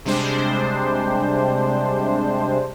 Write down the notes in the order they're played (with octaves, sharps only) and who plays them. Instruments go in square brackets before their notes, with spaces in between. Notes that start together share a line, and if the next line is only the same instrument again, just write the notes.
[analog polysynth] C3 G3 G#3 D4 C5